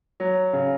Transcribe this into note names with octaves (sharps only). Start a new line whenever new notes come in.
F#3
C#3